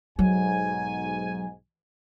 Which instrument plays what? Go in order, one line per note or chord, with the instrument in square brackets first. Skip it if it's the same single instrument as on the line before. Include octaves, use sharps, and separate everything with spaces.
[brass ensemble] B1 G#2 G#5 [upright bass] F#3